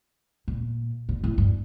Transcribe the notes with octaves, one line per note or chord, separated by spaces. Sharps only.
A#2
A#2
A2
G2